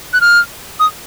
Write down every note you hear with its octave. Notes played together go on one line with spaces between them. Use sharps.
F#6
F6
D#6